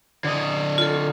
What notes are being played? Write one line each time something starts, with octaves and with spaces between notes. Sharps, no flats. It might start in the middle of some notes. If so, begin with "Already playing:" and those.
D3 D#5
F4 A4